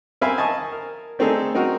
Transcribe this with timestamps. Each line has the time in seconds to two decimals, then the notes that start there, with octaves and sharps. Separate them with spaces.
0.21 C4 A#4 E5 F5 G#5 B5
0.37 D#5 G#5 A5 C#6 D#6
0.72 A#4
1.19 A3 C4 D4 D#4 G#4 A4
1.55 C4 D#4 F#4 A#4